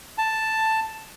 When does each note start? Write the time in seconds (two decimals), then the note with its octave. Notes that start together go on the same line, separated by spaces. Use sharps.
0.18 A5